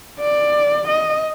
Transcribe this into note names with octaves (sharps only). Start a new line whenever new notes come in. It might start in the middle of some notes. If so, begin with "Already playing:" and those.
D5
D#5